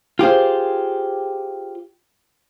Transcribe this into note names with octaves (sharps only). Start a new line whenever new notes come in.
F4 G4 G#4 C5